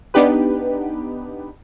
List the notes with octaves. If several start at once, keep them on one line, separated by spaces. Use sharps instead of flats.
B3 D4 D#4 G4 B4